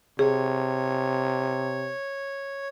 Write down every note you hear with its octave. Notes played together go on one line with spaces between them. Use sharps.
C3 G#4 C#5